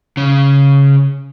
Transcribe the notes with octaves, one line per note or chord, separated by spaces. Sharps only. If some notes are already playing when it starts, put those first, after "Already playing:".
C#3